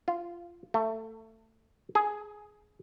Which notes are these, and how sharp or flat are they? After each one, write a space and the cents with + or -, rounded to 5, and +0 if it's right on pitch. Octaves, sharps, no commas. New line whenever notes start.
F4 -15
A3 +20
G#4 +10